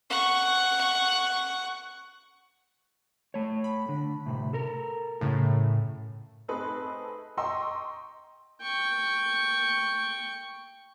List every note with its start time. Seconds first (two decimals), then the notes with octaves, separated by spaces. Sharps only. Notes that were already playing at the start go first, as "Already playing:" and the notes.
0.10 F#5 C#6
3.34 A3 C#5
3.64 B5
3.89 D3
4.26 A2 C3
4.53 A4 A#4
5.21 A2 C#3
6.48 A3 C4 D#4 G#4 B4
7.37 D#5 G5 A#5 C6 C#6 E6
8.62 G5 C#6